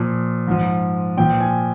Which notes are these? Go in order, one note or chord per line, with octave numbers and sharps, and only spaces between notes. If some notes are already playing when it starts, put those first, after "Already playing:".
Already playing: A#2 F3
G#2 F3
A#2 F3 G5
G#5